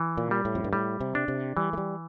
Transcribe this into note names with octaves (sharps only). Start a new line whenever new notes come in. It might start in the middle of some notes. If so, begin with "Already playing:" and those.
Already playing: E3
A#2
G3
A2
F2
G2
A2 G3
C3
D4
C3
E3 G3
A3
G3